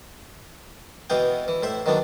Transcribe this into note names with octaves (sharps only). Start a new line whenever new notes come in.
B2 E3 B3 F5 G5
E3
A2 C5 E5
D#3 F#3 B3 D4